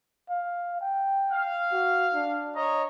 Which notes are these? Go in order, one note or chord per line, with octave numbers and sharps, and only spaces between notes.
F5
G5
F5
F#4
D4
C#5 D#5 A#5